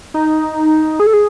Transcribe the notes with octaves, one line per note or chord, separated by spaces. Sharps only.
D#4
G#4
A4
G#4